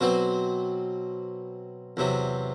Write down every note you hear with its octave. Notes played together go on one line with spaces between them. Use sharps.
B2 F#3 C4 F#4
E2 C3 F#3